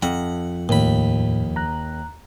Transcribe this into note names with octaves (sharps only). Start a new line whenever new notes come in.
F2 F#5
D#2 A2 B5
A#5 F#6